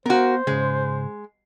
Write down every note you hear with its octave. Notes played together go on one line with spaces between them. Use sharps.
B3 F#4 A#4 C5 F5
G#2 C#3 G#3